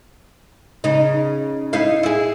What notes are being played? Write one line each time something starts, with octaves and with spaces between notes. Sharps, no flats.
C#3 D#4
D#4 E4 F5
E4 G#4